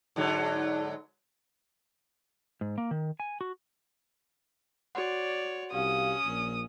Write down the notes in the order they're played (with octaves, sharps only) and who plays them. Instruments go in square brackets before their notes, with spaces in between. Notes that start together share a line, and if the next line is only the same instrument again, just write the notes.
[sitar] G#2 D3 F#3
[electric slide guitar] G#2
A#3
D#3
G#5
F#4
[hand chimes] F#4 F#5 [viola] C#5 D5
[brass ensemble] C2 G4 F5 [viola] C#4 [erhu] D#6
[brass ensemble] A#1 A#2